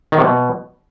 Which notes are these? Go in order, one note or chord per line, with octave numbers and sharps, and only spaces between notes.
D#3
C3
B2